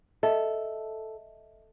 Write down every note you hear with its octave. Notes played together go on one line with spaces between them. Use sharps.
A4 D#5 E5